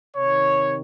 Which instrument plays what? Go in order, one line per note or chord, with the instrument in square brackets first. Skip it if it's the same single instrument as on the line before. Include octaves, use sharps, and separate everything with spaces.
[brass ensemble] C3 D#3 C#5